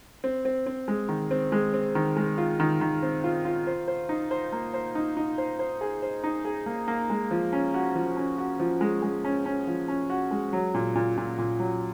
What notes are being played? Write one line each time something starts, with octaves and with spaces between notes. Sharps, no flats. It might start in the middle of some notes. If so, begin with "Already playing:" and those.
C4
C4
C4
G#3
D#3
C4
G#3
C4
D#3
G#3
F4
D#3
D#3
C4
F4
F4
C5
C5
D#4
C5
A#3
C5
D#4
D#4
C5
C5
G#4
C5
D#4
G#4
A#3
A#3
G#3
F3
C#4
F#4
F3
C#4
F#4
F3
G#3
G#3
C#4
C#4
F3
C#4
F#4
G#3
F#3
A#2
A#2
A#2
A#2
F#3